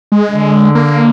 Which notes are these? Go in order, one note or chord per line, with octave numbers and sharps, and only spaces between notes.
G#3
D3
A#3